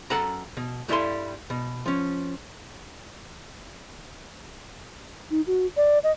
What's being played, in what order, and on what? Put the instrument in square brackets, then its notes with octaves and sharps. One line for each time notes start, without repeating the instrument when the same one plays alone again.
[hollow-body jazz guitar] F#2 A4 F#5 A#5
B2
G2 F#3 G3 E4 A4 C6
B2
F3 C#4
[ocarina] D#4
F#4
D5
D#5